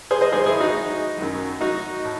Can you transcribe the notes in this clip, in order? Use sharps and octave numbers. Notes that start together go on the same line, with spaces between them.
G#4 C5
C5 D#5
G#2 D#3 F#3 G#4 C5
E4 G#4
D#4 F#4
F#2 D#3 F#3
D#4 F#4
A2